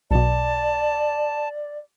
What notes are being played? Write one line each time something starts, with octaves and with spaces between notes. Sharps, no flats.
B1 B2 D5 A5